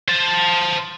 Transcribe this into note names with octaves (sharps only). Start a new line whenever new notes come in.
C5 A5